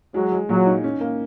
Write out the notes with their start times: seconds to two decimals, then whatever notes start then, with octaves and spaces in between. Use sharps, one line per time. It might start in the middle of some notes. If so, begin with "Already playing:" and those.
0.14 F#3 G#3
0.32 G#3
0.49 A#2 F#3
0.66 D#4
0.84 C#4
1.00 A#3